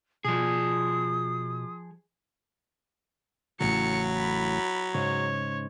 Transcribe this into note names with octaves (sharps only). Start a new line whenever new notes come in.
B2 F3 G#4 D#6
A1 A2 C#3 F#3 C#7
B5
G#2 C#3 C#5